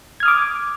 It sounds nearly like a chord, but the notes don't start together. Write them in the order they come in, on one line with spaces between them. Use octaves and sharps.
G#6 F6 D#6 D6